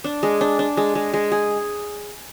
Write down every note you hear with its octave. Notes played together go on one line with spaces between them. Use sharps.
D4
G#3
D4
D4
G#3
G#3
G#3
G#4